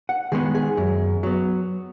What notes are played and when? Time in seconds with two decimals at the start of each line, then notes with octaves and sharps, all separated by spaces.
0.09 F#5
0.32 D#3 G#3 B3 G#4
0.55 G#4
0.77 F#2
1.23 F#3 B3